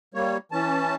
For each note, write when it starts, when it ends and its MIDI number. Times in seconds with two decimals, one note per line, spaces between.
0.14 0.37 55
0.14 0.37 58
0.14 0.37 73
0.52 0.95 52
0.52 0.95 61
0.52 0.95 81